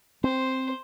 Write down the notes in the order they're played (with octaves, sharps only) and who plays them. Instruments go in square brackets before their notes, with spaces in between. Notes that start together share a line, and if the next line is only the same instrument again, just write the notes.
[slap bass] C4 [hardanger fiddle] C5